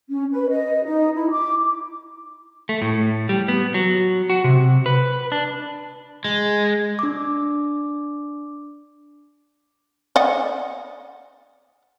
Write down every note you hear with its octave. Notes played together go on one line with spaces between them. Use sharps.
C#4
B4
D#5
D#4
E4
D6
A3
A2
G3
B3
F#3
F#4
C3
B4
D4
G#3
D4 D6
D5 D#5 F#5